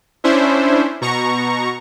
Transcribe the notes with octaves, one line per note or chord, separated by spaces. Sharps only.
C#4 D4 E4 C5 E5
B2 A#5 C#6